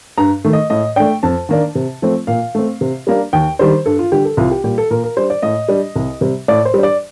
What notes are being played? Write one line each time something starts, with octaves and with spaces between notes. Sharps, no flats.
G2 A#5
D#3 A3
D#5
A2 D#5
A3 D4 G5
F2 A5
D#3 A#3 D4
C3
F3 A3 C4
A#2 F5
A3 C4
C3
G3 A#3 D4
D#2 G5
D#3 G3 D4 C5
G2 A4
F4
D3 G3 G4
A4
C2 F4
G4
A#2 G3 G4
A4
A#2 A#4
A#4
G3 D4 C5
D5
A2 D#5
G3 D4
C2
C3 G3
A2 D5
C5
G3 D4
D5